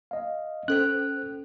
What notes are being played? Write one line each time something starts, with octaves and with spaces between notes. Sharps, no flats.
D#5 F5
C#4 A4 C5 F#6